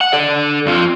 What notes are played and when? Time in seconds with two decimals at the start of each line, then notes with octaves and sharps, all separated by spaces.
0.01 F#5
0.13 A4 D5
0.66 F2 F3